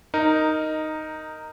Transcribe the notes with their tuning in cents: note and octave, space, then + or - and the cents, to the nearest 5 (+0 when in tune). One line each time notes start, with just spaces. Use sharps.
D#4 +0 A#4 -10